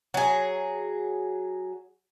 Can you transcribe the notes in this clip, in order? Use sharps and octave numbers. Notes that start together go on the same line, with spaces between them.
F#3 G#4